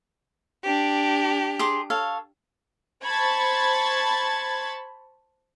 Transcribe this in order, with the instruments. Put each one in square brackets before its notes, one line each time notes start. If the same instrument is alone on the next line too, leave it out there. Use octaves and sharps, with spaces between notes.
[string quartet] D4 G4
[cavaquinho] G#4 C6 D6
A4 C#5 F5
[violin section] C5 A5 B5 C#6 G#6 A6